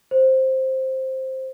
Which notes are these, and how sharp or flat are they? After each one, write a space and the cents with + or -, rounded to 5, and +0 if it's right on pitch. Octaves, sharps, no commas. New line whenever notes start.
C5 +5